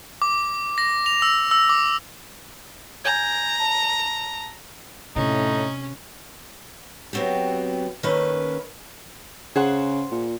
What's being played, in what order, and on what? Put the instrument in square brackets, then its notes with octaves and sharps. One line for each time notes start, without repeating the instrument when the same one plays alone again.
[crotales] D6
A#6
F7
E6
E6
D6
[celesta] G#5 G6 G#6 [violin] A#5
[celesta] A5
[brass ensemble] A2 [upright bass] C3 A#3 [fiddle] C#4 [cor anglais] D#4
[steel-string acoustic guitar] F#3 B3 C4 F#4 G4
D#3 A3 A#3 C#4 B4
[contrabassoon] C#3 [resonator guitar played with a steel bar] G#4 C5 F#5
[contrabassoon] A#2